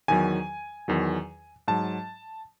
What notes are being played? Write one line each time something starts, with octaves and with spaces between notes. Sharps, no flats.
E2 D#3 F#3 G#5
E2 D#3 F#3
G#2 F#3 A5